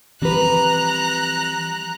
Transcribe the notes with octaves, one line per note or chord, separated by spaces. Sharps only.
E3 F3 G3 C4 B4 A#5 F#6